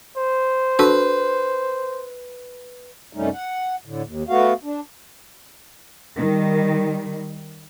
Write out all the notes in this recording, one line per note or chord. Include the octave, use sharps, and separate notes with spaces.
C5
D4 F#4 A4 B4
F#2 C3 G3 A3 C#4 D#4
F#5
A2 D3
D#2
A3 B3 F#4 F5
D4
D#3 G3